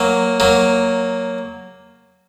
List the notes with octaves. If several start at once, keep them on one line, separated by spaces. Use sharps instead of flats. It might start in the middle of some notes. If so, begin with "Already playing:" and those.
Already playing: F#3 A#3
F#3 A#3